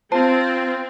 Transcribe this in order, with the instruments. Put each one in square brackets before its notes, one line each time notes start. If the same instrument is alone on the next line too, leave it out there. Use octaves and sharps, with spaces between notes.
[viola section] C4 [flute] F4 [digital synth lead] C5 [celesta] A5